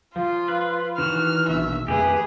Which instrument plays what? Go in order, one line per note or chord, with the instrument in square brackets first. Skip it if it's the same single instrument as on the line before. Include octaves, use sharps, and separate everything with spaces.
[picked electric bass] F3 [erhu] F4
[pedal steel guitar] B4
[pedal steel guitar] D#3 E3 F#4 [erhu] F6
[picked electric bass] A#1 B2 [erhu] E5
[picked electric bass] F2 D#3 A3 [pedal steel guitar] G4 B4 [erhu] G#4